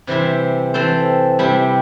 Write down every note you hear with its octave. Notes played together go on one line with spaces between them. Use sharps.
C3 E3 G3 E4 C5
E3 C4 A4 C5
C3 G3 E4